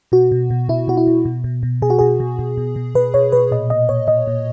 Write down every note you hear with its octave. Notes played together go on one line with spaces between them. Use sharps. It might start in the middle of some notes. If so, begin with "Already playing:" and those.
B2 F#4
B2
B2
B2 E4
B2 F#4
E4
B2
B2
B2
B2
B2 G#4
F#4
B2 G#4
B2
B2
B2
B2
B2 B4
B2 C#5
B2 B4
A#2 D#5
A#2 D#5
A#2 C#5
A#2 D#5
A#2